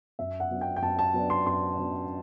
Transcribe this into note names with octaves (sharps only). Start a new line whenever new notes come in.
F#2 E5
F#5
F#3 B3 D4
G5
G5
F#2 A5
A5
F#3 B3 D4
C6
F#2 C6
F#3 B3 D4